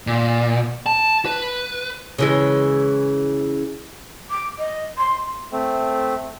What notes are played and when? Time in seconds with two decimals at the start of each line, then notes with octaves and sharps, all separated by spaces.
0.07 A#2
0.86 A5
1.26 B4
2.18 C#3 E3 G#3
4.30 D6
4.58 D#5
4.97 C6
5.52 A3 C4